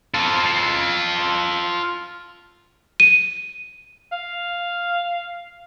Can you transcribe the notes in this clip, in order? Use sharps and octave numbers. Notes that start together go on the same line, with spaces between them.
F4 A4
D#7
F5